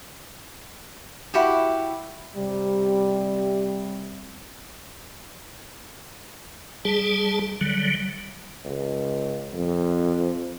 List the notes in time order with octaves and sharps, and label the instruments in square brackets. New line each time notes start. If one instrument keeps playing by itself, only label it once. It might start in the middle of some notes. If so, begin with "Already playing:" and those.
[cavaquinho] E4 F#4 G4
[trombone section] C3 G3
[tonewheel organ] G3 G#4 A5
D3 F#3 G3
[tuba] C#2
F2